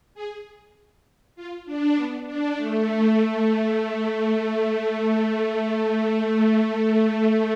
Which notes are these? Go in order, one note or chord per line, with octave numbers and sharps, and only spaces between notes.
G#4
F4
D4
B3
D4
A3
A3